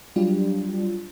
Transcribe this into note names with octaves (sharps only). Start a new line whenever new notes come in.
F#3 G3 D4 F4